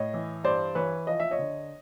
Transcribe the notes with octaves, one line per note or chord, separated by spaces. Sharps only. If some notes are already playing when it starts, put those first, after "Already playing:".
Already playing: A2 C#5 D#5
E3
G2 C5 D5
E3 B4 C#5
F3 D#5
E5
C#5 D#5
D3